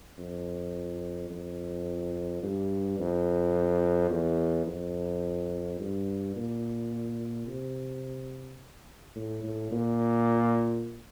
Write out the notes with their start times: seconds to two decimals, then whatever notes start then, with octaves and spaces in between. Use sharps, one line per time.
0.18 F2
1.30 F2
2.43 G2
2.99 F2
4.10 E2
4.66 F2
5.80 G2
6.35 A#2
7.47 C3
9.15 A2
9.43 A2
9.72 A#2